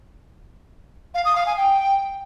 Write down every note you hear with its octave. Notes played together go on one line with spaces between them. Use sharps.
F5
D#6
F5
G#5
G5